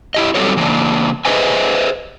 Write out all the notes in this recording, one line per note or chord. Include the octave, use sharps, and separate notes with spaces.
E4 G4 D#5
F#3 G3 C4 F#4 A4 C#5
C#3 E3 A#3 D4
G#4 B4 C5 D#5 E5 G#5